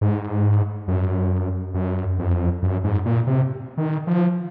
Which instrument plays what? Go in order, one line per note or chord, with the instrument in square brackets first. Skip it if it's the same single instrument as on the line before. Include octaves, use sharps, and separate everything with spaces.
[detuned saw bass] G#2
F#2
F#2
F2
F#2
G#2
A#2
C3
D#3
F3